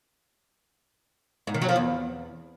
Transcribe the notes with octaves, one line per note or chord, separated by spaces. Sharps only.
G#2
D#3
F#3
F3
E2